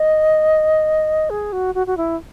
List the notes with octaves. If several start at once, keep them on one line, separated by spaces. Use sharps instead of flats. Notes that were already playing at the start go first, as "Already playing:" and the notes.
Already playing: D#5
G#4
F#4
F#4
F#4
E4